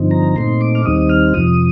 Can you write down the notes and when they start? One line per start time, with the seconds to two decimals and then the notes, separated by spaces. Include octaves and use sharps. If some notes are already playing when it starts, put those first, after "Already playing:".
Already playing: G2 D3 F3 C4 D#4
0.11 A#5
0.36 A#2 A3 C4 D#4 C6
0.61 D6
0.75 F6
0.85 D#2 D#3 G3 C4 D#4 D#6
1.09 F6
1.34 F2 C3 F3 D#6